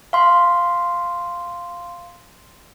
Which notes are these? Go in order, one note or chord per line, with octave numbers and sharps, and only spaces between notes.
F5 C6